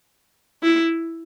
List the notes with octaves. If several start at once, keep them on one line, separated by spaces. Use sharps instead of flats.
E4